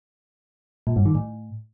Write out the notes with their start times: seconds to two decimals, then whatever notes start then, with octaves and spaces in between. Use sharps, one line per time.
0.87 A#2
0.96 G2
1.06 D#3
1.15 A2